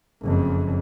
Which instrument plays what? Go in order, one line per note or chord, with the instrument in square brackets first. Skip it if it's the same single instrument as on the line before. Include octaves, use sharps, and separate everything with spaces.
[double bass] F#1 F2